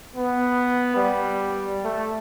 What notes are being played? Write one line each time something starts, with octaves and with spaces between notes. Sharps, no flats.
B3
G3
A3